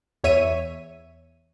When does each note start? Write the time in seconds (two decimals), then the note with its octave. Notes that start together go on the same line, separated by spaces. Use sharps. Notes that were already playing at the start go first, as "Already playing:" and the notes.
0.24 E2 C#5 E5 D#7